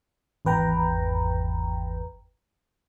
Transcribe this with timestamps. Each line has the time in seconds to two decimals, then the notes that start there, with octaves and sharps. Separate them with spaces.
0.45 G#1 E2 B4 G5 A#5